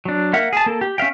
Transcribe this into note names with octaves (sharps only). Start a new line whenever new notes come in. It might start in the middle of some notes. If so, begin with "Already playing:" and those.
F#3 D4
A#3 E5 F#5 F6
G#4 A5
A#3 A4
G4
C#4 E5 F5 G5